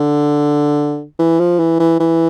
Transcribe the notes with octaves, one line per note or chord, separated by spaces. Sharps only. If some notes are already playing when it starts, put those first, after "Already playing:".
Already playing: D3
E3
F3
E3
E3
E3